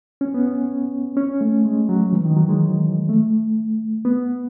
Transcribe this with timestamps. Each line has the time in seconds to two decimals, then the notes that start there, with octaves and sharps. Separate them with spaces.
0.21 C#4
0.34 B3
0.47 C#4
1.17 C#4
1.41 A3
1.65 G#3
1.89 F#3
2.13 E3
2.25 D#3
2.37 F#3
2.49 G#3
3.09 A3
4.05 B3